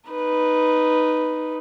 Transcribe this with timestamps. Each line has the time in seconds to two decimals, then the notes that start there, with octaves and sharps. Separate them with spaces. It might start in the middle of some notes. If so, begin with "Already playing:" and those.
0.10 D#4 B4